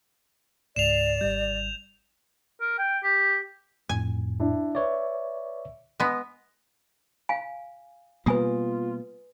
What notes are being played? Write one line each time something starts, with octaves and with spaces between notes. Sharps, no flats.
C#2 G#2 D5 C7 E7 F7
G#1 G3 G6
A#4
G5
G4
F2 A2 G#5
D4 E4
B4 C#5 D5 E5
G#3 B3 A#6
F5 G#5
B2 G3 A#3 F4 B4 G#5 D#6